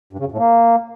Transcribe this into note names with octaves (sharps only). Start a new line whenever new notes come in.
G2
C#3
F#2
A2
A#3